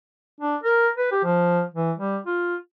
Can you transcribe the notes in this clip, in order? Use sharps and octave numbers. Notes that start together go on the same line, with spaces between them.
D4
A#4
B4
G4
F3
E3
G3
F4